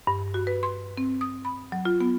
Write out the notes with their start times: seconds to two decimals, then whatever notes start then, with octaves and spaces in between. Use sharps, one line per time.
0.07 G2
0.34 F#4
0.47 B4
0.63 C6
0.97 C4
1.21 D#6
1.45 B5
1.72 F#3
1.85 F4
2.01 B3